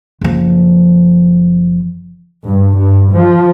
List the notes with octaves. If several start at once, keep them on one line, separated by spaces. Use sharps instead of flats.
F#1 F3
G2
G2
F3